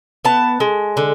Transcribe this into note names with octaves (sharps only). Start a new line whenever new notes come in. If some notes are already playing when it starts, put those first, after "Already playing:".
B3 A5
G#3
D3